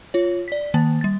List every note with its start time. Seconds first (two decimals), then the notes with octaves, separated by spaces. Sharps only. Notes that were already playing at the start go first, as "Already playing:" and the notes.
0.14 F4 C#5
0.48 D5 B6
0.74 D#3 A#3 A5 A6
1.01 G3 A6